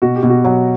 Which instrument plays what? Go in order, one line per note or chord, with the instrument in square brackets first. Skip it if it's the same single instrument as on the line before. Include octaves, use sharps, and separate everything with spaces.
[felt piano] B2 [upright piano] F#4
[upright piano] G4
[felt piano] B2
[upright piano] F#4
[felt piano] F#3